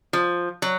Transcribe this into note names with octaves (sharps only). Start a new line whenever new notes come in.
F3
F#3